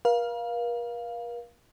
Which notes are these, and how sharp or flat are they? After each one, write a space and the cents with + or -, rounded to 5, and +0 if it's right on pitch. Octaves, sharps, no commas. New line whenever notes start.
A#4 +45 F5 +0